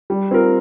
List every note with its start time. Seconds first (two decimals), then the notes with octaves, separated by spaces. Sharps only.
0.10 G3
0.31 C4 F4 A#4